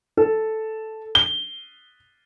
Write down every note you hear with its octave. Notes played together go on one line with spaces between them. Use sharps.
A4
G7